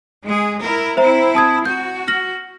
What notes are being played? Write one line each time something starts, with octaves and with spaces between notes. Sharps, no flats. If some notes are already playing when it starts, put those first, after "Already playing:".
G#3 G#4
E4 A#4
C4 E4 C5 E5 A#5
A5 D#6 G#6
F#4 G6
F6 A#6 F#7